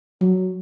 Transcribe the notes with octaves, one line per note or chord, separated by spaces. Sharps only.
F#3